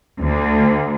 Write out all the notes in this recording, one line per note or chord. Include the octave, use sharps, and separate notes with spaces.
D2